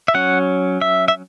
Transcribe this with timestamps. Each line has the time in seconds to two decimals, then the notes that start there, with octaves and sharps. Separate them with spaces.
0.08 E5
0.14 F#3 C#4 F#5
0.81 E5
1.08 E5